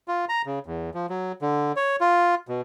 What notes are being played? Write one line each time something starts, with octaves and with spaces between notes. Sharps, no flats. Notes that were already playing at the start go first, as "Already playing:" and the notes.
F4
A#5
C#3
E2
F3
F#3
D3
C#5
F4
B2